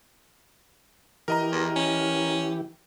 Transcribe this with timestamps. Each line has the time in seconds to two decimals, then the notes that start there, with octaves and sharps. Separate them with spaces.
1.28 E3 G4 A#4 D#5 A#5
1.52 E2
1.76 C#4